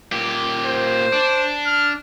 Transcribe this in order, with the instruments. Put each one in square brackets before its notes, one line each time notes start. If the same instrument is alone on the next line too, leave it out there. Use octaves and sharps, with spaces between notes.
[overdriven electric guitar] A#2 G4
[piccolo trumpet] C5
[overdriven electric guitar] D4
[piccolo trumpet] F6